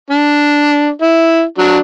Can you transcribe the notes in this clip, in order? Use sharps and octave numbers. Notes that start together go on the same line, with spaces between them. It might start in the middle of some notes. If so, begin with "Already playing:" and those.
D4
E4
F#3 D4